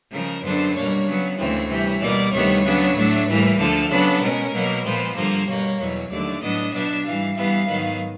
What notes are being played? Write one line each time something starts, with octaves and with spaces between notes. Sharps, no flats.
C#3 F3 G#3 A#4
F#2 D3 F#3 B3 D4 C5
B2 G3 A#3 D4 C#5
C#3 F#3 B3
D2 C#3 E3 G#3 C4 C#5
C3 E3 G3
B2 G3 A#3 D5
D2 C3 D#3 G3 B3 C#5
C#3 F#3 B3 D4
A2 F#3 A3 D4
A2 E3 G3 A#3 B4
D2 D3 F3 A4
C#3 F#3 B3 D4 A4
B2 G#3 C#4 A#4
B2 F#3 A#3
A#2 F3 G#3 B3 C5
G2 D3 F3 A#3 C5
B2 G3 A#3 C#5
E2 B2 F#3 C#5
D#2 D3 F#3 A3 D5
A2 F#3 B3 D4 D#5
B2 F#3 B3 D4 E5
G#2 E3 G3 F5
G2 E3 G3 B3 F5
G#2 D#3 F#3 B3